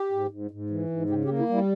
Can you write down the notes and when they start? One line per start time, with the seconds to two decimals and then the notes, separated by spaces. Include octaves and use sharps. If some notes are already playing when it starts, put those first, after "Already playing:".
Already playing: G4
0.12 G#2
0.30 G#2
0.51 G#2
0.70 E3
0.90 G#2
1.10 C#3 G4
1.25 G4
1.29 A#3
1.39 E4
1.49 G3 E4